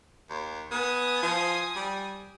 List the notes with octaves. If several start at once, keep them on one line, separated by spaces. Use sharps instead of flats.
D#2
B3 G#5 D#6
F3
G3